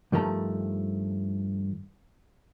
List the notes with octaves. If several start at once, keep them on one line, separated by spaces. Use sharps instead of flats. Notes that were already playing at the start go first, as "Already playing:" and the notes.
G2 D#3 F3 A3 A#5